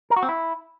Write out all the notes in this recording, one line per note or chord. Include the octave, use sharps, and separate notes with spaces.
A#4
F#4
C4
E4